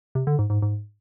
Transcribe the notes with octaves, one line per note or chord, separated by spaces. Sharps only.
C3
D3
G#2
G#2
G#2